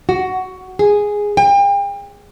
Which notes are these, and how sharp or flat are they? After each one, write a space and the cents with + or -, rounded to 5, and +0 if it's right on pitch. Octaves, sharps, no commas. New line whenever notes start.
F#4 +10
G#4 -5
G5 +35